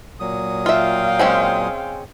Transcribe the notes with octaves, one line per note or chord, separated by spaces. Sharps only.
A#2 F#3 D#6
F4 E5 F5 G5
G#3 C4 C#4